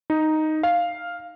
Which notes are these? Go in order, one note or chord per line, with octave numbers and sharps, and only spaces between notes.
D#4
F5